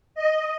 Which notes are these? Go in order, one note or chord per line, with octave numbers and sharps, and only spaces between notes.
D#5